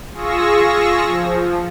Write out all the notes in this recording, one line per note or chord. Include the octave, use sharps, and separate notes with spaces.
F4 G#4 C#6 E6 A#6
F3